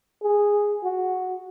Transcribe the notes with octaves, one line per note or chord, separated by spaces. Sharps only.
G#4
F#4